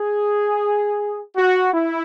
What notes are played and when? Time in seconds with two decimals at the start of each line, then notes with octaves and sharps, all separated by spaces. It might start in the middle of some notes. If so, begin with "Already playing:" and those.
Already playing: G#4
1.35 F#4
1.72 E4